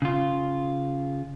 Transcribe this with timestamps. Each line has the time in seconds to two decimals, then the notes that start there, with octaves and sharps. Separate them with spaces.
0.02 C#3 F4